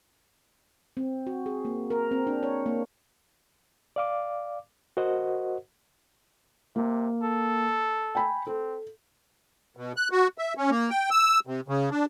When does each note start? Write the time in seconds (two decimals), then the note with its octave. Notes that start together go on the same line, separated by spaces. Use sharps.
0.97 C4
1.27 F#4
1.46 G#4
1.65 A#3
1.90 A#4
2.11 C4
2.27 D4
2.43 C#5
2.66 A#3
3.96 D5 F5 D6
4.97 F#4 A#4 C5 D#5 F#5
6.76 C3 A#3
7.23 A4
8.15 G5 G#5 B5
8.47 C4 A4
9.77 B2
9.97 F#6
10.11 F#4
10.38 E5
10.57 C#4
10.70 A#3
10.90 G5
11.11 E6
11.47 C3
11.68 C#3
11.91 D4